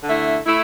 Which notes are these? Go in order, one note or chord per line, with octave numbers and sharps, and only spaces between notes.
D3 A3 E4
A3 E4